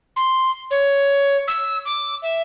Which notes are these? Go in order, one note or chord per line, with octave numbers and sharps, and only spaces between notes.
C6
C#5
E6
D6
E5